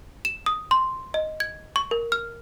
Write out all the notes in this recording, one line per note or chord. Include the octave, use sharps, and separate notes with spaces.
E7
D#6
C6
D#5
G#6
C#6
A#4
F6